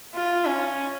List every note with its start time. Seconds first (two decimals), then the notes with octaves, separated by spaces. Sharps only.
0.15 F4
0.46 C#4